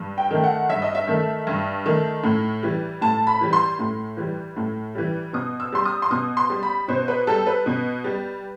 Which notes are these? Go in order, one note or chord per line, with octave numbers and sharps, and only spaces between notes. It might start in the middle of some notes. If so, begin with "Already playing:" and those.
Already playing: G2
G5
D#3 A3
F#5
G2 E5
D#5
E5
D#3 A3
G2
D#3 A3
A2
E3 G3
A2 A5
B5
E3 G3
C6
A2
E3 G3
A2
E3 G3
B2 D#6
E6
G3 C6
D#6
C6
B2 D#6
C6
G3
B5
B2 C5
B4
G3 A4
B4
B2
G3